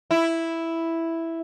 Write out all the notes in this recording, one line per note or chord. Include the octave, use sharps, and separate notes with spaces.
E4